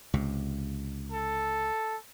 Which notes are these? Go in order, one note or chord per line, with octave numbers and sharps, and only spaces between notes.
C#2 C3
A4